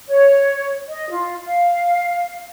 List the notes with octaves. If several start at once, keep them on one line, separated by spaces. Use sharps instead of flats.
C#5
D#5
F4
F5